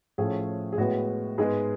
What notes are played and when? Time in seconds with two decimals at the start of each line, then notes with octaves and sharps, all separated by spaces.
0.18 A2 F3 A3 C#4 G#4
0.72 G#4
0.78 A2 G#3 B3 F#4
1.38 G#2 G#3 B3 G#4